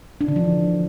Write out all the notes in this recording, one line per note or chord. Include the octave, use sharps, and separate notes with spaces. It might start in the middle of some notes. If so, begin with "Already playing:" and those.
D4
D3
F3
E3